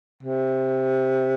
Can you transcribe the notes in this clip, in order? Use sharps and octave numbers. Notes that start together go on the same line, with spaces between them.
C3